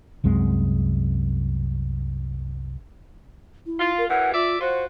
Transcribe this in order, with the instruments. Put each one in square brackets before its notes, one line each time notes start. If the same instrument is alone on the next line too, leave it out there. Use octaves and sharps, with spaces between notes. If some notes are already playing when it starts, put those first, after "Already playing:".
[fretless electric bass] C2 F#2 G#3 C4
[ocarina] E4
[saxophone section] F4
[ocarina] A#4
[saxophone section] F#2 E3 [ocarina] F#5
[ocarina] F4 [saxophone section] D5 E5
[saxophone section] F4 F#4 [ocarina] C5